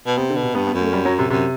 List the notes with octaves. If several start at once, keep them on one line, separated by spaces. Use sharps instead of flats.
B2
C3 B3
D3
B2
C3
G2 B3
B3
F#2
A3
G3
F#3
C3
F#2 C3